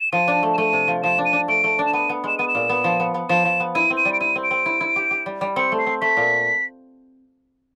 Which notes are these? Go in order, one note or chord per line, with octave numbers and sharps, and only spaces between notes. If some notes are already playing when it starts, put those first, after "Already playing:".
E7
F3 D#7
D4
A3
E7
A3 D#7
C3
F3
F3 E7
D4
D#7
D4
A3 D7
A3
D4
E7
B3 D#7
B3
G#3 E7
B3 D#7
E7
A#2
B3
F3
B3
B3
F3 E7
F3
B3
E4 D#7
C4
D#7
G3
D7
E4 D#7
C4
D7
C4
E4
E4
G4
G4
G3
G3
C4 C#7
A3
C7
C4
A3 B6
A#2